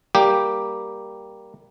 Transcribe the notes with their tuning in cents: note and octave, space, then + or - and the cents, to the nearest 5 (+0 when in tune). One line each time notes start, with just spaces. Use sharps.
G3 +0 A#3 +0 G4 +0